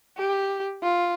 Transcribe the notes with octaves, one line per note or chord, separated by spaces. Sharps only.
G4
F4